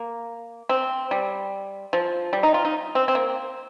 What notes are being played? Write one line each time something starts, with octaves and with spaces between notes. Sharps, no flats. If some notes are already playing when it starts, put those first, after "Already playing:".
Already playing: A#3
C4
G3
F3
G3
D#4
F4
D#4
C4
C4
A#3